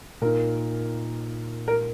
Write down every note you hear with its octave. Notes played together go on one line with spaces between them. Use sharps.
A#2 A#3 D#4 A#4
A#4